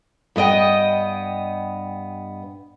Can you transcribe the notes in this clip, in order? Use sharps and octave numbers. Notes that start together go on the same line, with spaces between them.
G2 B3 D#5 G5